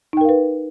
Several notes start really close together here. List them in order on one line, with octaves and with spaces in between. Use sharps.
D#4 G5 A#4 F5 B4